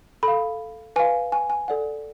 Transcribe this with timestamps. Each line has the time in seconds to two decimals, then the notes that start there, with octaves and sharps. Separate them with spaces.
0.23 A4 F5 B5
0.96 B4 F5 G#5
1.32 G#5
1.50 G#5
1.68 A4 D5 F#5